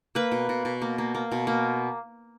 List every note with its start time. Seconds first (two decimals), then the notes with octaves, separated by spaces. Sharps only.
0.15 A#3 B4
0.32 B2
0.49 B2
0.65 B2
0.82 A#3
0.98 A#3
1.15 A#3
1.32 B2
1.47 A#3